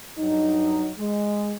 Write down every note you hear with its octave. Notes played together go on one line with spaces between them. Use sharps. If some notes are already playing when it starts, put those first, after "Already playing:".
G2 F#3 D#4
G#3